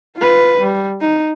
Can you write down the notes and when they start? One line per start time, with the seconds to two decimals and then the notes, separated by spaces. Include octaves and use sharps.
0.18 F4 B4
0.60 G3
1.01 D#4